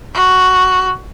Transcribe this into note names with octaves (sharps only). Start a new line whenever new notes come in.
F#4